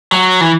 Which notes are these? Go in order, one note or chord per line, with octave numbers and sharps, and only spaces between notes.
F#3
E3